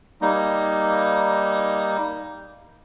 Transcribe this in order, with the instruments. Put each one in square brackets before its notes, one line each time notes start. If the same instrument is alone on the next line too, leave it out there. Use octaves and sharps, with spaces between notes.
[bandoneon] G3 A#3 D#4